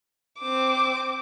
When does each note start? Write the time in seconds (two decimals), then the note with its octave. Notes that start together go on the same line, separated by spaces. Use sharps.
0.39 C4 D6